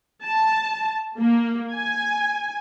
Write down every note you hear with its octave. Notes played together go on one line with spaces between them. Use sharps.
A5
A#3
G#5